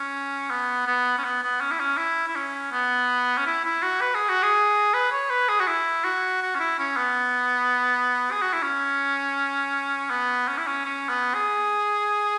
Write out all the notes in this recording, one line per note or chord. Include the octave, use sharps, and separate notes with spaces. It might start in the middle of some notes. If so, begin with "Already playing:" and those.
Already playing: C#4
B3
B3
C#4
B3
B3
C#4
E4
C#4
E4
E4
C#4
B3
C#4
E4
E4
F#4
B4
G#4
F#4
G#4
B4
C#5
B4
G#4
F#4
E4
F#4
F#4
C#4
E4
C#4
B3
G#4
F#4
E4
C#4
B3
C#4
E4
C#4
C#4
B3
G#4